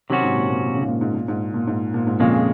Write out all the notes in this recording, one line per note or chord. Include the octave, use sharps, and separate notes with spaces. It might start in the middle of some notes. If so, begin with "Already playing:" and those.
C3 D#3 F#3 C#4 F#4
G#2
A#2
A#2
A#2
C#3
G#2
A#2
G#2
A#2
G#2
A#2
G#2
A#2
G#2
F2 A#2 C#3 G#3